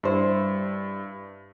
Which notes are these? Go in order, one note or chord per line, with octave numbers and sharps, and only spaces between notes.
G2 E4 C5